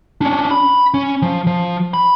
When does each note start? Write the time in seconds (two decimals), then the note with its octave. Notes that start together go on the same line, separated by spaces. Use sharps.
0.21 C#4 D4
0.51 B5
0.94 C#4
1.22 F3
1.47 F3
1.94 B5